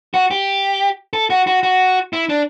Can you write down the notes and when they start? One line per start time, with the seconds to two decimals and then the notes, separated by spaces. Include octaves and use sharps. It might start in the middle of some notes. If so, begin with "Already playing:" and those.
0.14 F#4
0.31 G4
1.13 A4
1.30 F#4
1.47 F#4
1.63 F#4
2.13 E4
2.29 D4